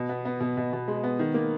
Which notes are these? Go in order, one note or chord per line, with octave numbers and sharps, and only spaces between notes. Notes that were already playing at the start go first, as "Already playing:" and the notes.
Already playing: B2
B3
B3
B2
B2
B2
G#3
B3
D#3
A#3